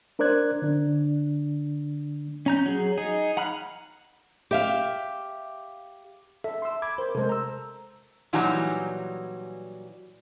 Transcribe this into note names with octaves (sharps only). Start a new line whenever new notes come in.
D4 A#4 C5 D5 F#6 G#6
D3 D4
C#4 A#5 G6
F#3 G#4
D#4 G#4
F#5 A#5 B5 F6 F#6
G4 E5 F5
A4 E5
C6 E6
B5 D6 G#6
A#4 C5
C3 G#3 A4 A#4 C5
A#5 E6
A#2 E3 F#3 G3 D#4 A#5